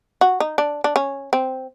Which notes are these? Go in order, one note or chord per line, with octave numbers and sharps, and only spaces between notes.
F#4
D#4
D4
D4
C#4
C4